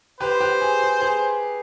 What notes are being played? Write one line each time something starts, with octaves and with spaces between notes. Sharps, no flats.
G4 B4 C5
G4 B4
G#4
G#4
G#4